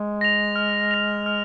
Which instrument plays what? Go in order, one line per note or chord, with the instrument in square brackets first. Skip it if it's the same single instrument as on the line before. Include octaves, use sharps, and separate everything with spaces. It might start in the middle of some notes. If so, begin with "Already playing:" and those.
Already playing: [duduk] G#3
[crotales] A#6 F7
F6
A#6 F7
F6